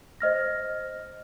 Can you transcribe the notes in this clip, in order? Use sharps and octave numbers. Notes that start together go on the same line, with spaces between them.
C5 D#5 F6 A#6